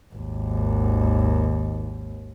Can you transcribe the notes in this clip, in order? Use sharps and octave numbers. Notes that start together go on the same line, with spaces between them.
G#1 D#2